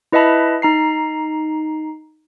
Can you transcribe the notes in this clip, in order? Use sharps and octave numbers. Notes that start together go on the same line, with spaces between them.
E4 B4 D#5 E5 A5 B5
D#4 A#5 C7